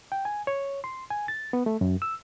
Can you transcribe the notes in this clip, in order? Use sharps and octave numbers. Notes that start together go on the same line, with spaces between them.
G5
G#5
C#5
C6
G#5
A6
B3
A3
F#2
E6